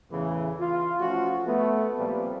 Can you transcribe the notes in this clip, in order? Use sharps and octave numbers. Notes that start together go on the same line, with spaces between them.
E2 A2 C#3 E3
F4
F3 A3 C#4 F4 F#4
A3 B3
A#2 F3 G3 A#3 C4 B4